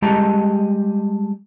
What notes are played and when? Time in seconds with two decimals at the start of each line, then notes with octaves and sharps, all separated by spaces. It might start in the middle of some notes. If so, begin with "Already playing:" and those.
0.02 G3 G#3 G4 D#5 A5 A#5